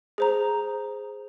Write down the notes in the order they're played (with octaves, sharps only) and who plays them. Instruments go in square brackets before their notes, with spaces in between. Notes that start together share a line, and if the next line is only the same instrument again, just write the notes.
[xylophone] G#4 C5 A#5